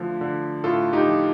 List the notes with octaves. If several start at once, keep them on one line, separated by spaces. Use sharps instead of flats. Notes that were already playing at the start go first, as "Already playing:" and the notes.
Already playing: D3 F3 A3
D3
A2 F4 A4
D#4 G4
F3